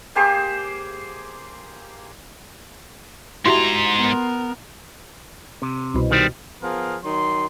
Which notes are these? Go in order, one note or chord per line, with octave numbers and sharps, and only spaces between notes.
A#3 G4 G#4 C5
G#2 E4 F#4 G4 A#5 C6
B3 A#4
C3
C2 B2
D#3 G3 C4
F3 B3 G#4 A#4 F5
D#3 F#3 C6